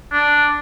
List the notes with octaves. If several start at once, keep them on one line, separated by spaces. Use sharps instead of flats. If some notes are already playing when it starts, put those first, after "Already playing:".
D4